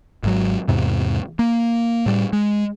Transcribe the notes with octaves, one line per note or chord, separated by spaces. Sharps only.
G#1 G#2 F#3
E2 G#2 C3
A#3
A2 G3
G#3